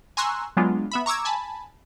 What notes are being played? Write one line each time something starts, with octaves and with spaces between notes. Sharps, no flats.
G#5 A#5 C6 C#6 E6 F#6
F#3 G#3 B3 D4 F4
B3 E5 B5
A#5 C#6 D6 E6 G#6
G#5 A5 B5